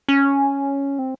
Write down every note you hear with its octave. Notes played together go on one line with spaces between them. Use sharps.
C#4
C4